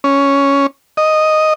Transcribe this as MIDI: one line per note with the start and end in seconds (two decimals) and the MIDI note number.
0.04 0.67 61
0.97 1.53 75